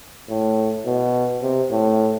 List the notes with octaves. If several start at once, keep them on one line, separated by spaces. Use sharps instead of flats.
A2
B2
C3
A2